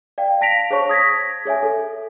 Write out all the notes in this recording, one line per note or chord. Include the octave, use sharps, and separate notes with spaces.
D5 F5 G5
F5 A5 A#6 B6 D7 F7
G#4 C5 C#5 A5 C#6
D#6 G#6 A#6 B6
G#4 C#5 E5 G#5
A4